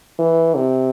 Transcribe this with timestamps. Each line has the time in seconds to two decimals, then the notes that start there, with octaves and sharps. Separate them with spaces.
0.19 E3
0.56 C3